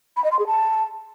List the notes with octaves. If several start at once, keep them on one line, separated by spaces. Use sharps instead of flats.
B5
D#5
C6
G#4
A5